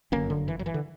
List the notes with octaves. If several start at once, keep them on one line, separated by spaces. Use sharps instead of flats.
G1 F#2 D3 A#3 C#4
D3
E3
F#3
E3
D3